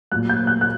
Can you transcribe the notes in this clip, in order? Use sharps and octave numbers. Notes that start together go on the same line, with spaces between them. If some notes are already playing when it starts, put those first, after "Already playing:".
A#2 F#3 F#6
G6
F#6
F#6